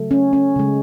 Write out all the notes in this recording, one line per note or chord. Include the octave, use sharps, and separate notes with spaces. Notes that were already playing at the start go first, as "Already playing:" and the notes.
Already playing: C#3 F#3 A3
C#4
C#4
C#3 G#3